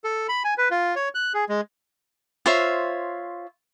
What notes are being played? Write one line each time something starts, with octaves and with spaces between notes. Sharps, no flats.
A4
B5
G#5
B4
F4
C#5
F#6
G#4
G#3
F4 C5 C#5 E5